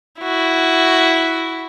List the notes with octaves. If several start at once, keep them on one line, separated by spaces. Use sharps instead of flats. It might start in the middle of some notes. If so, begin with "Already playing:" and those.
E4 F#4